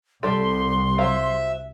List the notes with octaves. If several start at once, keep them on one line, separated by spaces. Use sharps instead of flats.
C2 G3 A4 C6
F#3 C5 E5 F5